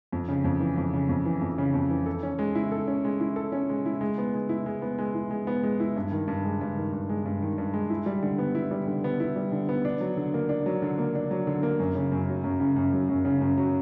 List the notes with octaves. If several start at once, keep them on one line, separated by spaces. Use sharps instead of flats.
F2
C#3
F2
E3
F2
C#3
F2
E3
F2
C#3
F2
E3
A4
C#4
G#3
E4
A4
C#4
G#3
E4
A4
C#4
G#3
E4
G#3
B3
G#3
E4
G#3
B3
G#3
E4
G#3
B3
G#3
E4
G2
D#3
G2
G#3
G2
D#3
G2
G#3
G2
D#3
G2
G#3
E4
G3
D3
B3
E4
G3
D3
B3
E4
G3
D3
B3
D4
F#3
D3
A#3
D4
F#3
D3
A#3
D4
F#3
D3
A#3
F#2
C#3
F#2
F#3
F#2
C#3
F#2
F#3
F#2
C#3
F#2
F#3